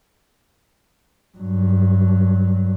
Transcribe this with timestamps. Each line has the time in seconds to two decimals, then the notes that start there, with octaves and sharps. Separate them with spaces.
1.37 G2 F#3